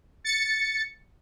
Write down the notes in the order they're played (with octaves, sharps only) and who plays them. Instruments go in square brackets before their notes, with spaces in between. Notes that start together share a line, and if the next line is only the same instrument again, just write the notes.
[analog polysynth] A6 C#7